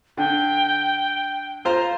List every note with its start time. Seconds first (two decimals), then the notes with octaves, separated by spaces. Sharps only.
0.18 D3 G5
1.65 F4 C5 A#5